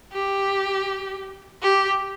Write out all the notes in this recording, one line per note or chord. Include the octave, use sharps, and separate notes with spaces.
G4
G4